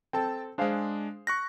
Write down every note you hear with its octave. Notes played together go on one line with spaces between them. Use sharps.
C4 A4 G5 A5
G#3 D4 G#4 C5 F5
C#6 F#6 A#6